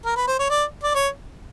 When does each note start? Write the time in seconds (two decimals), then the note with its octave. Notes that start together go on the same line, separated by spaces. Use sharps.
0.05 A#4
0.17 B4
0.28 C5
0.39 C#5
0.50 D5
0.84 D5
0.95 C#5